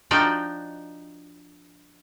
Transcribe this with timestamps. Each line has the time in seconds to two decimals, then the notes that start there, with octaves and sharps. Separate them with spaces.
0.11 F3 D4 D#4 F#4 G5